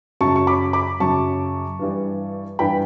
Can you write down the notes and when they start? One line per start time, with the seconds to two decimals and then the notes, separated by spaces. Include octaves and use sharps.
0.21 F#2 C#3 F#3 A5 C#6
0.36 C#6
0.47 B5 D6
0.73 B5 D6
1.00 F#2 C#3 F#3 A5 C#6
1.79 G2 E3 G3
2.59 G2 E3 G3 G5 B5